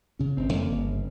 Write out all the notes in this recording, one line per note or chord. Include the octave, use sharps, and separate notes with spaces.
C#3 C#4
G1 C4
F2 A#3
G1
C#3